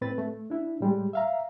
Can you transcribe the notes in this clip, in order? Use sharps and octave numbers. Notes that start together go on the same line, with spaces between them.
A2 C4 B4 A6
A3
D4 E4
A2 G3 G#3
E5 F5 A#5